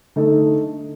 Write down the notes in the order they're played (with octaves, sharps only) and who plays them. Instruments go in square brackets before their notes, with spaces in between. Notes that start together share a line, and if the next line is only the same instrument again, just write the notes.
[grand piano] D3 A3 D#4 A4